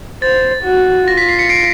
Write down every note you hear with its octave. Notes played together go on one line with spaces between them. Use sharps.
C5 A6
F#4
F4 A#6
B6
C7
B6 C#7
C7 D7